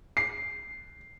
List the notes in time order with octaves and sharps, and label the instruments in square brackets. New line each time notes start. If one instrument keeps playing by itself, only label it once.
[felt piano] C7